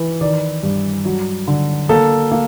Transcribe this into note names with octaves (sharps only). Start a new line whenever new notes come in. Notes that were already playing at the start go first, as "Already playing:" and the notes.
Already playing: E3
D#3 D5
G2
F#3
D3
A#3 A4
A#3